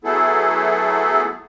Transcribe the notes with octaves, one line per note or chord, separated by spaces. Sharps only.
F#3 A3 B3 E4 G#4 A4